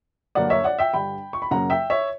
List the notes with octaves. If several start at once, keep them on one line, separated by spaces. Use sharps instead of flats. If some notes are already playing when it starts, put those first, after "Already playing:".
G2 D3 F#3 A#3 D5 F#5
C#5 E5
D5 F#5
E5 G5
G2 D3 G3 G5 B5
C#6
B5
F#2 C#3 F#3 A#3 F#5 A#5
E5 G5
C#5 E5